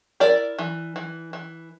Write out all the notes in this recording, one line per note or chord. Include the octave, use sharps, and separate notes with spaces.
E4 A#4 D5
E3
E3
E3